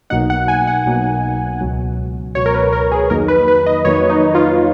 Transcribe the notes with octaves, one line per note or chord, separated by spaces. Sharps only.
B1 B2 F#3 A#3 D#4 F#5
F#5
G#5
F#5
B1 B2 F#3 A#3 D#4
C#2 B2 F#3
C#2 B2 F#3 C#5
A#4
B4
A#4
G#4
F2 D#3 F#3 A#3 D#4 A#4
B4
B4
D#5
F2 D#3 F#3 A#3 D#4 C#5
D#4
F4